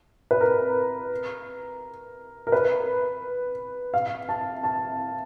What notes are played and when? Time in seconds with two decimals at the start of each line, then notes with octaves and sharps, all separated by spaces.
0.31 B4
0.41 A#4
2.47 A#4
2.52 B4
3.94 F5
4.29 A5
4.63 A5